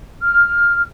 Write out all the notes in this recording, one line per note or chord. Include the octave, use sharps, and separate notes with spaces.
F6